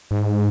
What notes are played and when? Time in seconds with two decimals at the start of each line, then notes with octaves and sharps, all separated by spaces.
0.11 G#2